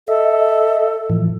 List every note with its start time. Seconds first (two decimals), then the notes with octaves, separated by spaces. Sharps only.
0.08 A4 D#5 E5
1.10 A2 E3 F3